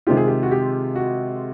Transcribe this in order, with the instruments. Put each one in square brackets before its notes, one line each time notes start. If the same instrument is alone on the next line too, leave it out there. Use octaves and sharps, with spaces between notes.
[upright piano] C3 D#3 G#3 C4 F4 [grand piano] G4
[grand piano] G#4
G4
F#4
G4
F#4